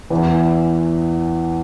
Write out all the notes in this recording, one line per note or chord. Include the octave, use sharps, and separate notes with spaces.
E2 E3